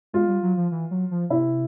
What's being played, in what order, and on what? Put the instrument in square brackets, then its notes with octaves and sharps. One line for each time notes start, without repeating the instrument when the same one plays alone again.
[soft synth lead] G#3 [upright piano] F4
[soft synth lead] G3
F#3
F3
E3
F#3
F3
[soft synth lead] C3 [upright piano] E4